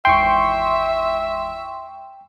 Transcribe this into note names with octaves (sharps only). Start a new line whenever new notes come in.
G#1 E2 E5 G5 C6 C#6 D7